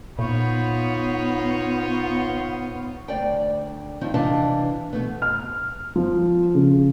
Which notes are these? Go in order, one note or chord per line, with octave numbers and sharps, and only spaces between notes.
A#2 B3 D#4 F4 C5 C#5 B5 C#6
D2 D5 G5
D#3 F3 C4 D#4
C3 E3 D4 D#5 F5 A5
B2 A3 B3
F6
F3
C#3